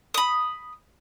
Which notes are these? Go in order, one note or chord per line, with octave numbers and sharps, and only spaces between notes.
B5 D#6